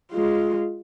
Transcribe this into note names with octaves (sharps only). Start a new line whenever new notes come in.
G#3 F4